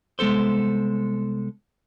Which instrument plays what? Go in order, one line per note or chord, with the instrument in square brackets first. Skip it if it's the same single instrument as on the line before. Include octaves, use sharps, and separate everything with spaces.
[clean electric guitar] C2 G#3 B3 A4 C5